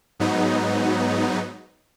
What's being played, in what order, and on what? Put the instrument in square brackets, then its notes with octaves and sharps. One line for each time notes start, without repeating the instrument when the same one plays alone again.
[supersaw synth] G#2 F#3 B3 D#4